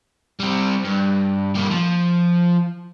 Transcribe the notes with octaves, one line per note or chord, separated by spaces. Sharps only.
G3 C4
G2
G3 A#3
F3